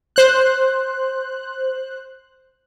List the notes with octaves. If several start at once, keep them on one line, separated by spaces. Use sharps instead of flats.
C5 F#6